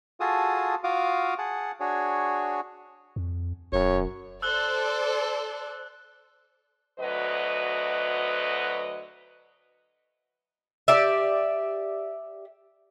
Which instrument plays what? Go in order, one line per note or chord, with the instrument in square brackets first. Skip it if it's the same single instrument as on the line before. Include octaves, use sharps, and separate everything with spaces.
[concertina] F4 F#4 G#4 A4 A5 D#6
F4 F#4 F5 D6 D#6
G#4 F#5 A5
D4 F#4 G#4 C#5
[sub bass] F2
[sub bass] E1 [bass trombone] F#2 [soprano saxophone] C#5
[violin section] A4 C5 D5 [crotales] E6 F#6 G7
[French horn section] D2 F#3 B4 D#5
[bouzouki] G4 D5 E5